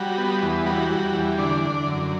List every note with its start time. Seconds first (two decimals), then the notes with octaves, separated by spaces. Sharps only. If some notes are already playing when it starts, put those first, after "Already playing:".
Already playing: G3 F#4
0.18 B3
0.42 E2
0.66 G3 F#4
0.90 G3
1.14 E2
1.38 D3 D4
1.63 D3
1.87 F#2